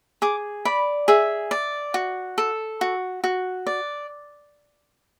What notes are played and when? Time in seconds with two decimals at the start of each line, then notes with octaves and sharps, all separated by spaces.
0.22 G#4 D6
0.65 D5 B5
1.08 G#4 E5
1.51 D5
1.94 F#4
2.38 A4
2.81 F#4
3.24 F#4
3.67 D5